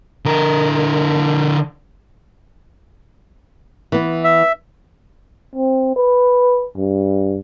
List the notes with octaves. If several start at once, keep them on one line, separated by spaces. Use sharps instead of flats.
D3 A#4
E3 B3
E5
C4
B4
G2